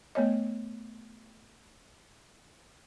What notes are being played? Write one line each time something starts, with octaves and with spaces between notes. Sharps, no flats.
A3 B3 C#5 D#5